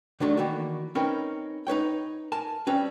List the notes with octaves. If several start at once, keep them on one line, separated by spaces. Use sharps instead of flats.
D3 D#3 F#3 G#3 A3 D4
D#3 E3 A#3 F#4
C4 C#4 D#4 A#4 B4
D#4 B4 C#5 G5
A#4 G#5 A5
G3 C4 C#4 B4